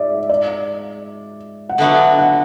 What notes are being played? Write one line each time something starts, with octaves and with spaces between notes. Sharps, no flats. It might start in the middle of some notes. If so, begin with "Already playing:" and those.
Already playing: G#2 D5 E5
D5
F#5
D3 F#3 B3 D4 E5
F#5